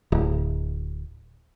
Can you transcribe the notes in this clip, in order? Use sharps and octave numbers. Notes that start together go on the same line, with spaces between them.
D1